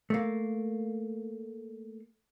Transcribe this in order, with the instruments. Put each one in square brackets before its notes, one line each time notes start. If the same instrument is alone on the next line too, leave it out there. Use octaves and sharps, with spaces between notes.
[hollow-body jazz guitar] A3 A#3